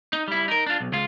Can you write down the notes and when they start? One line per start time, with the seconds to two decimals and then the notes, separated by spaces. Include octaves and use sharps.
0.13 D#4
0.28 G3 E4
0.48 D#4 A#4
0.66 D4 F4
0.80 B1
0.92 C#2 F4